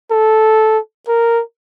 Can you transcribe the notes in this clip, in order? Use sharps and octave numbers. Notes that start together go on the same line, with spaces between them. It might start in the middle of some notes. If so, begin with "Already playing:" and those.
A4
A#4